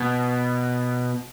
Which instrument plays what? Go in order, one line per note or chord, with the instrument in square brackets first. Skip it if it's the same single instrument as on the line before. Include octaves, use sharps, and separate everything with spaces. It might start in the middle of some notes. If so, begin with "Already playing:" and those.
Already playing: [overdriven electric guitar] B2